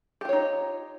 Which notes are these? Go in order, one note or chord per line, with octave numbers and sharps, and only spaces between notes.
D#4 F4 G4 C#5